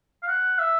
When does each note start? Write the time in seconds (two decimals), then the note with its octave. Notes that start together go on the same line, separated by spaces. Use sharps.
0.23 F5
0.28 F#5
0.59 E5